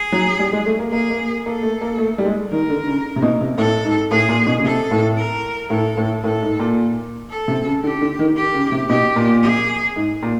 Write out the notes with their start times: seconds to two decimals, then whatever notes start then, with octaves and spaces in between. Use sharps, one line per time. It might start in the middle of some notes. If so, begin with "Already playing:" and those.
Already playing: G#4
0.12 F#3
0.39 G3
0.52 G#3
0.66 A3
0.79 A#3
0.92 A#3 G#4
1.10 A#3
1.45 A#3 A4
1.63 A3
1.81 A#3
1.98 A3
2.18 G3
2.25 G#3
2.51 D#3 A#4
2.70 D3
2.87 C#3
3.16 C3
3.22 B2
3.41 C3
3.58 A2 A4
3.84 G#2
4.11 A2 G#4
4.29 A#2
4.47 B2
4.58 C#3
4.64 C3 A4
4.91 A2
5.17 A#4
5.70 A2 A4
5.97 A2
6.23 A2 A4
6.42 G#2
6.59 A#2
7.30 A4
7.48 C3
7.65 C#3
7.83 D3 G4
8.01 D3
8.19 D#3
8.36 G4
8.54 C#3
8.72 C3
8.89 B2 G4
9.16 A#2
9.42 G#4
9.96 G#2
10.23 A#2